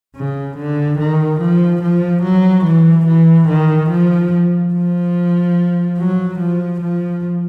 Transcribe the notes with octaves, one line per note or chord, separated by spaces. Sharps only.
C#3
D3
D#3
F3
F3
F#3
E3
E3
D#3
F3
F3
F#3
F3
F3